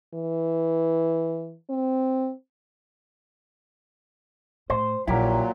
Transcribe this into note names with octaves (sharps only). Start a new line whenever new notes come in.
E3
C4
A2 C5
A#1 A#2 F3 F#3 E4 G4 A#4